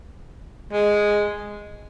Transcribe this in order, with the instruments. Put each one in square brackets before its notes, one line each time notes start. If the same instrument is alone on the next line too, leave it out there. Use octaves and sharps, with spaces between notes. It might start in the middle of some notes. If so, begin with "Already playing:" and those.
[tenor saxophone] G#3